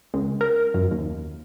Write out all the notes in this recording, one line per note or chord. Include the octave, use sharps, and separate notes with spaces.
C#2
A#4
F#2
D#2